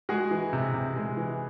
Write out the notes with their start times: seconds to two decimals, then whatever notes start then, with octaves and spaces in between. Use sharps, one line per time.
0.09 G#3 F#4 G#4
0.31 E3
0.53 C3
0.74 C3
0.96 G#3
1.17 E3